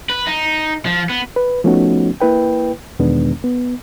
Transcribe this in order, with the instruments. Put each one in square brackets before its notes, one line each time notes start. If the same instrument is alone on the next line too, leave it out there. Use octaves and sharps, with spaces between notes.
[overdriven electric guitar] B4
D#4
F3
B3
[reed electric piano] B4
F3 A3 B3 C#4 D#4 F#4
A#3 E4 B4 G5
E2 B2 D#3 G#3 B3 D4
B3